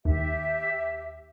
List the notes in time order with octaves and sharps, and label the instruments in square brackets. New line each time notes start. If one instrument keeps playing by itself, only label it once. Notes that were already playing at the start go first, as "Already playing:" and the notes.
[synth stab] D#2 [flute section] G4 E5